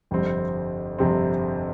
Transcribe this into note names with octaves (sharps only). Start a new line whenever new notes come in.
G1 F2 C3 G3 C4
G1 F2 C3 G3 C4